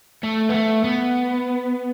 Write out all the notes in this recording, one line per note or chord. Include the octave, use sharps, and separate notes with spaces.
A3
B3
A3
B3